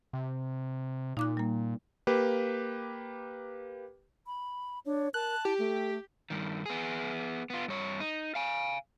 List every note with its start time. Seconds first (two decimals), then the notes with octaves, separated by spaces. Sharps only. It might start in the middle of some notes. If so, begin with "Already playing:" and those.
0.13 C3
1.17 A#2 D#4 D6 F#6
1.37 G3 A#3
2.07 A#3 G4 B4
4.26 B5
4.86 D4 C#5
5.14 A#4 A5 F#6
5.45 E4 G4
5.59 A3 A4
6.30 G2 D#3
6.66 B3 G#4
7.50 B3 F4
7.68 G2 C#5
8.00 D#4
8.35 F5 G#5